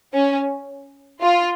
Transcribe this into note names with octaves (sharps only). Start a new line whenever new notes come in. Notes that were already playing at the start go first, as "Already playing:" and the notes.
C#4
F4